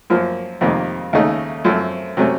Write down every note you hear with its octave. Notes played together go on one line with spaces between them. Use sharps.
F#2 F3 A#3
F2 C3 D#3 A#3
D#2 C#3 A3 D#4
F#2 F3 A3 C4
C3 F#3 A3 C#4